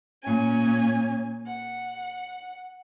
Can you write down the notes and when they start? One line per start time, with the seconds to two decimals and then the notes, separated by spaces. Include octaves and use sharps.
0.23 A#2 C#4 G#5
1.46 F#5